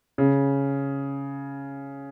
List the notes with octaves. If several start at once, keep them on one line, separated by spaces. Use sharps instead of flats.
C#3